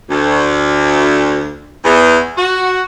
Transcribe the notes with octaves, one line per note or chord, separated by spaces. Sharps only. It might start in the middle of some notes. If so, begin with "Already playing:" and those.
D2
E2
F#4